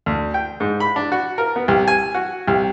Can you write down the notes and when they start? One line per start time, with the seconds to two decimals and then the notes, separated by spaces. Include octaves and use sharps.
0.06 D2
0.34 G5
0.60 G#2
0.80 B5
0.96 D4
1.12 F#4
1.38 A#4
1.56 B3
1.68 C2
1.88 G#5
2.14 F#4
2.48 C2